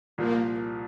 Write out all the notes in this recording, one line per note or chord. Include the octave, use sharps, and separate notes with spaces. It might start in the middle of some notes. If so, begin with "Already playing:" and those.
C2 A#2 F3 A#3